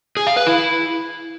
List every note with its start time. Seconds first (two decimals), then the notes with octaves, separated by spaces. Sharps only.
0.17 G#4
0.27 F5
0.37 B4
0.46 E4